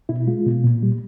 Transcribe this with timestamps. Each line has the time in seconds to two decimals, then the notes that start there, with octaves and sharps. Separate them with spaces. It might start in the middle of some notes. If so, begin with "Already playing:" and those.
0.09 B2 E4
0.27 G#3 F4
0.46 B2
0.64 A#2
0.83 G3